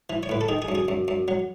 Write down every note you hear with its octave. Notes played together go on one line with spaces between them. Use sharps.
E3
C#5
A2 B4
A4
D#3 G#4
G#4
F#2
G#4
F#2
F#2
F#3